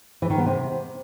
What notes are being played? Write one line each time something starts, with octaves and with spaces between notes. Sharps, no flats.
E3
D#3
B3
C3